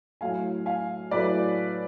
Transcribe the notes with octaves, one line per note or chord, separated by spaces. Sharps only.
A2 F#3 A3 F5 G#5
F5 G#5
A2 F#3 A3 B4 D5